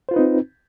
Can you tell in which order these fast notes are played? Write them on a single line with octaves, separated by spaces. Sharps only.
C5 F4 B4 D#4 C4